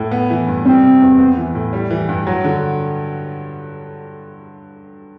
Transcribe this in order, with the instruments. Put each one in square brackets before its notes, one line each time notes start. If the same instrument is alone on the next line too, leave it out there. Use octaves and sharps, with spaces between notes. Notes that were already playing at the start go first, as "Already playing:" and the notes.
Already playing: [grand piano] A2
B3
E3
G2
[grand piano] G3 [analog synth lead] C4
[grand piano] C3
E2
B3
E3
A2
G3
E3
G2
F#3
D3